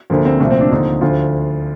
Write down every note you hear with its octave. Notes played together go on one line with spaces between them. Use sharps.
D2 D3 F3 A#3
C4
C2 A#2 F3 A3
C4
D4
D#2 D3 F3 D#4
D2 D3 F3 F4